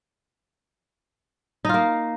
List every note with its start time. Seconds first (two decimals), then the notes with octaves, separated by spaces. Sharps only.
1.65 D#4
1.69 F4
1.74 A#3